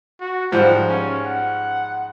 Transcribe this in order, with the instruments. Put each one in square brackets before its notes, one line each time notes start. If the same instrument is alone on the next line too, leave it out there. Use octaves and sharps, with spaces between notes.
[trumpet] F#4
[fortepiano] G#2 F3 G3 [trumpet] F#5
[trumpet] C#4
F#5